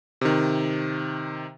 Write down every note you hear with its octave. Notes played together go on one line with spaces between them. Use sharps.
C3 D#3